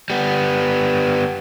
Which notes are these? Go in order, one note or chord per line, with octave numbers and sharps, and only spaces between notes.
G3 B3